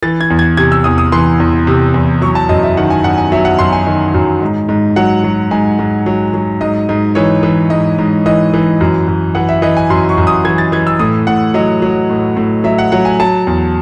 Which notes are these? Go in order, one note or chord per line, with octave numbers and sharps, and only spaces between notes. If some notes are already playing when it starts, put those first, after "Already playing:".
E3 A6
G#6
E2
G#6
C3 G#6
E6
E2 D#6
D#6
E3 C6
E2
C3
E2
F#3 C#6
A5
F#2 D#5
E5
D#3 F#5
G#5
F#2 F#5
G#5
F#3 E5
F#5
F#2 C6
G#5
D#3
F#2
G#2
G#2
F#3 F#5
F#3
G#2 G#5
G#2
F#3
F#3
G#2 D#5
G#2
E3 C#5
E3
G#2 D#5
G#2
E3 D#5
E3
F#2
F#2
E3 F#5
E5
E3 D#5
G#5
F#2 C6
C#6
F#2
D#6
E3 G#6
A6
E3 G#6
E6
A2 D#6
A2 F#5
F#3 D#5
F#3
A2
A2
F#3 E5
F#5
F#3 F#5
G#5
F#3 A5
E2